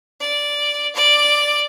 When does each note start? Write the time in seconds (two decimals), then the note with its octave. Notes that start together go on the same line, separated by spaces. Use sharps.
0.21 D5
0.95 D5